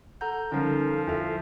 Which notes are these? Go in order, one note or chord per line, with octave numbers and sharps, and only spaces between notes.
A4 F#5 A#5 G6
D3 F3 G3 C#4 D#4 A4 A#4
E2 F4 E5 F5